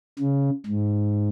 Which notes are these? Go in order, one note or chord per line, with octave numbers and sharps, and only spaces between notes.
C#3
G#2